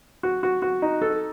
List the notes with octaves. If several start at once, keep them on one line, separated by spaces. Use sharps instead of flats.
F#4
F#4
F#4
D#4
A4